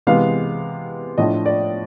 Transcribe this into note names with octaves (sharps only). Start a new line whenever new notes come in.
C3 E3 G#3 B3 F5
A2 F3 A3 D4 F4 D#5
D5